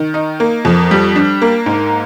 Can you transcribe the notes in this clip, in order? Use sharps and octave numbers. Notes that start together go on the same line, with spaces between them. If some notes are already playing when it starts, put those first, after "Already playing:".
Already playing: D#3
D#4
A#3
F2
G3
D4
A#3
G#2